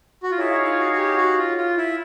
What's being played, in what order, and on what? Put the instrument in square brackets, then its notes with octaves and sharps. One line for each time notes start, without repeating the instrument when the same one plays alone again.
[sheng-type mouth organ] F#4
F4
[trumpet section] D#4 G#4 C#5 F5 [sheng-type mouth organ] E4
[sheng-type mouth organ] E4
F4
F#4
F#4
G4
F#4
F4
F4
E4